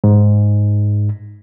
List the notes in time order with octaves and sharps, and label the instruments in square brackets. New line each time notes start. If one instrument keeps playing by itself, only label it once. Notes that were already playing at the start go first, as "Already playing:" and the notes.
[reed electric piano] G#2